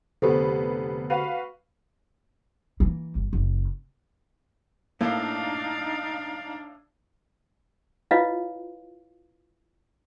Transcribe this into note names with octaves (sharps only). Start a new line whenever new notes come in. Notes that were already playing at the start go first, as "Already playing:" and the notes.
F1 D3 B3 G4 A4 C5
F#4 B4 F5
E3 A#3
G1
F#1
A2 A#3 D4 D#4 F5
E4 F4 B4 C#5 D#5 F5